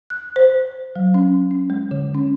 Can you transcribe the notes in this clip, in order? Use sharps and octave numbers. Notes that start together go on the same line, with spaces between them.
F#6
C5
F#3
C#4
C#4
G#3
D3
C#4